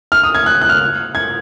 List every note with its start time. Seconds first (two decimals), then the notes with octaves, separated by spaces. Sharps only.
0.12 F6
0.23 D#6
0.35 G#6
0.46 F#6
0.62 F#6
0.69 F6
1.15 G#6